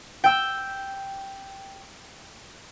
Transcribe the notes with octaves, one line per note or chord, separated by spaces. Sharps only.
G5 E6